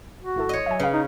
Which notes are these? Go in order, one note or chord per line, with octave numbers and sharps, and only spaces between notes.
F#4
G#1 E4 A4
C#5 D#5
F#3 E5 G#5
C#3 B4 F5
D#4